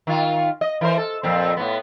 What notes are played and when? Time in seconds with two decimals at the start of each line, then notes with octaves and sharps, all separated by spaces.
0.07 D#3 F4
0.61 D#5
0.81 E3 A#4 C5
0.97 A4
1.23 F2 A#2 C4
1.57 A2 B3